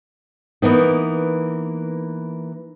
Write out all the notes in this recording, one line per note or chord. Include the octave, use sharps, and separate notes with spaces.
E3 A#3 B3 D#4